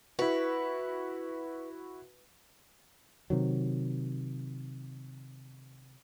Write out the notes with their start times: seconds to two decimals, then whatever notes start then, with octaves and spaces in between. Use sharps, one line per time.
0.19 E4 F#4 B4
3.30 C3 D#3 F#3